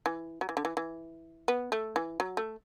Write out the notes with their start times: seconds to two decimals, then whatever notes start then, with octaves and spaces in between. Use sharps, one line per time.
0.06 E3
0.41 F#3
0.49 E3
0.57 D3
0.65 E3
0.77 E3
1.48 B3
1.72 A3
1.96 E3
2.20 F#3
2.37 A3